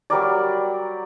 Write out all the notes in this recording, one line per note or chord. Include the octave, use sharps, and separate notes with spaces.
F#3 G3 A#4 D5